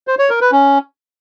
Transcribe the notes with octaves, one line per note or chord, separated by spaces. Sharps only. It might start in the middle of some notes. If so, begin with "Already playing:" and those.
C5
C#5
A#4
B4
C#4